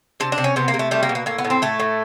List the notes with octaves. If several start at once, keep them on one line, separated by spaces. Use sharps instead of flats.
C3 D4
D4
C3
C#4
C3 B3
A#3
C3
A3
G3 A3
A#3
B2
A#3
A2 A#3
B3
A2
C4
A2 A3
A2